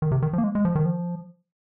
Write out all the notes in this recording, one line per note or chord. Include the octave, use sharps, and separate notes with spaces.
D#3
C3
D#3
F3
A#3
G#3
G#3
F3
D#3
F3